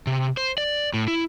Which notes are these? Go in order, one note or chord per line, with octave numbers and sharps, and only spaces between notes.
C3
C5
D5
A2
E4